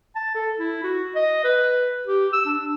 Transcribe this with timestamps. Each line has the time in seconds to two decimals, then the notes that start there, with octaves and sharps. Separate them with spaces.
0.16 A5
0.35 A4
0.59 E4
0.83 F#4
1.15 D#5
1.44 B4
2.07 G4
2.33 E6
2.46 D4